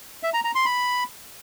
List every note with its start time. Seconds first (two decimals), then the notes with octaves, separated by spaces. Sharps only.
0.23 E5
0.34 A#5
0.44 A#5
0.55 C6
0.66 B5